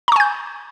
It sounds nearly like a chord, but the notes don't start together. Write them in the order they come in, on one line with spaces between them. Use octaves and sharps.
A#5 C#6 G#5 G6